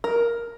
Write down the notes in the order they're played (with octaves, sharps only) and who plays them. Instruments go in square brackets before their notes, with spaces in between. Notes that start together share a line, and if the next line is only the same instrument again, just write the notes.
[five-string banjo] A#4